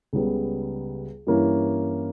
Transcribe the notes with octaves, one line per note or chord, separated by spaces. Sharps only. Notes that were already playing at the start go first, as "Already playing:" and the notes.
C#2 C#3 G3 B3
G2 E3 A#3 C#4